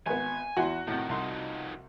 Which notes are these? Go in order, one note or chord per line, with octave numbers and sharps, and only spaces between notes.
G#1 B3 G#5
E2 E4 F#4 C6
A2 C3 D#3
C2 F3 D#4 C6